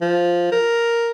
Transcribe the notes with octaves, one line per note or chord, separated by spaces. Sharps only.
F3
A#4